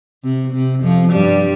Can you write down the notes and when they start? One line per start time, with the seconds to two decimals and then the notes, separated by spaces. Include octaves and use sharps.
0.24 C3
0.53 C3
0.82 F2 F3
1.12 G2 G3